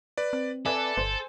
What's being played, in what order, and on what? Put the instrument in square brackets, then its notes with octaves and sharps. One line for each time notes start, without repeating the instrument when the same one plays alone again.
[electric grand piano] B4 D5
[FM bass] C4
[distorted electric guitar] A4 [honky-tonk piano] B4 D5 E5 [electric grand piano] G#5
[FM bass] G1 [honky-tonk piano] C5